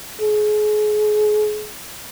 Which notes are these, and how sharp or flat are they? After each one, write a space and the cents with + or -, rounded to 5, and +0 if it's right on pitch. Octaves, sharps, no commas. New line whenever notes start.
G#4 +30